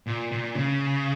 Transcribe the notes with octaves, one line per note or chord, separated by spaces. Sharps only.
A#2
A#2
C#3